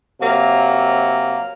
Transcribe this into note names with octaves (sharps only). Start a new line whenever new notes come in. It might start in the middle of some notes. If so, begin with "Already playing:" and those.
C3 F#3 A#3